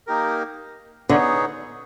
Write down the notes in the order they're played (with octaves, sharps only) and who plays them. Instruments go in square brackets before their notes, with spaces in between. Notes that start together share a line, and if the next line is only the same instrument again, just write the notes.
[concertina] A#3 D#4 G4 A#4
[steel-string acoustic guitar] D3 [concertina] B3 D#4 G#4 C#5